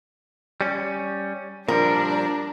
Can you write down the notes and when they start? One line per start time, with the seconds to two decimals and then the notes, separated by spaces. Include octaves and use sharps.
0.61 G3 C#4
1.68 A#2 F3 G3 D4 A#4